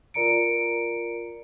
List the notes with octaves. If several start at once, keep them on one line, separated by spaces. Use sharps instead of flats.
F4 A#4 D5 A#5 C#7 D7